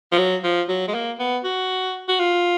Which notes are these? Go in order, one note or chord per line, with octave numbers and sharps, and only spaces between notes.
F3
F#3
F3
F#3
G#3
A#3
B3
F#4
F#4
F4